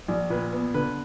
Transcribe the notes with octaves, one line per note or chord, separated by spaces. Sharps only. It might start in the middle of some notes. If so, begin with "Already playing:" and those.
A#1
A#2 B4
B3
D3 B4